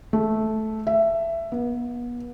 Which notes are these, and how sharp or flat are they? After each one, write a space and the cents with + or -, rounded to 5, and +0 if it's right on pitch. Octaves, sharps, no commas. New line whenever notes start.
A3 -10
E5 +15
B3 -35